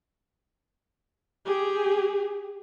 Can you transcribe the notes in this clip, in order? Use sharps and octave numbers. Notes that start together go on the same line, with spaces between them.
G4 G#4